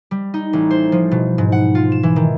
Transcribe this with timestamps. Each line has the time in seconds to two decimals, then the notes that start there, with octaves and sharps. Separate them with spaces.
0.11 G3
0.34 D#4
0.53 A1
0.71 C5
0.92 F3
1.11 B2
1.38 G#2
1.52 F#5
1.75 F4
1.92 E7
2.03 E3
2.16 D#3